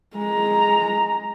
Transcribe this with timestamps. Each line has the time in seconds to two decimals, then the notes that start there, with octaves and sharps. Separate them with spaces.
0.16 G#3 A#5